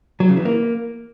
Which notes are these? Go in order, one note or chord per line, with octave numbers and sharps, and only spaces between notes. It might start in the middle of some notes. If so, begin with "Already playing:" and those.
F#3
C#3
E3
A#3